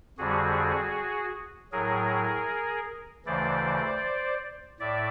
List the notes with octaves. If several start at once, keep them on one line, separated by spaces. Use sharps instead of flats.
F2 D3 G3 F#4 G#4
A2 F#3 G#4 A#4
D2 C#3 E3 C5 D5
A2 D5 E5